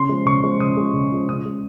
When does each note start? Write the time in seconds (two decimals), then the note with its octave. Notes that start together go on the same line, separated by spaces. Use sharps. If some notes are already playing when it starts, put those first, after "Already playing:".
Already playing: C#3 C6
0.09 F3 G#3
0.26 C#3 C#6
0.43 F3 G#3
0.60 C#3 D#6
0.77 F3 G#3
0.94 C#3
1.12 F3 G#3
1.29 C#3 D#6
1.46 G#3